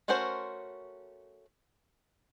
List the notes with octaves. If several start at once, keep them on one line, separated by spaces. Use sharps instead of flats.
A3 C#4 F#4 A#4 C5